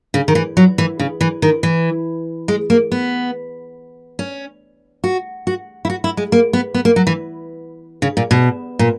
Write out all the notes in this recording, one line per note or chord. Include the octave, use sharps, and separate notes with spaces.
C#3
D#3
E3
F#3
E3
C#3
E3
D#3
E3
G#3
A#3
B3
C#4
F#4
F#4
E4
F#4
E4
G#3
A#3
B3
B3
A#3
F#3
E3
C#3
A#2
B2
A#2